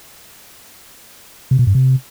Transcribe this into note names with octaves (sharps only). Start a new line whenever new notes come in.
C3
B2
G2
C3